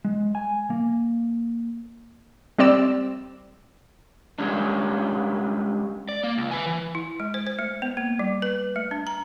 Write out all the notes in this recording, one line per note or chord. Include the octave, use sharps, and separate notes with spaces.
G#3
G#5
A#3
G3 C4 D5 E6
G3 G#3 C#4 D4
D5
A#3
C#2
B4 G#5
E3
E4
G#3
C5
C5
A3
B3
A#3
G3
B4
A3
D4
A#5